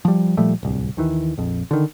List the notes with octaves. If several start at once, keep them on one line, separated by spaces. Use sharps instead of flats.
F3 G3
A#2 F3 G3 A3
D1 C2
D#2 D#3 E3
A#1 F2
D3 D#3